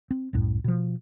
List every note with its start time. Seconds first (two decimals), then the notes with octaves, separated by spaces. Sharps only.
0.11 C4
0.33 C2 F#2 A2
0.64 B2 F3